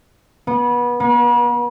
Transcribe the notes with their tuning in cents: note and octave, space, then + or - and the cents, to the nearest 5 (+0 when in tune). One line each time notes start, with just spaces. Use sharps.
B3 -25
B3 -45